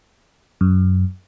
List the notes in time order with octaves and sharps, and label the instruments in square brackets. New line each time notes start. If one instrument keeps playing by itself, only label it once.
[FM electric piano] F#2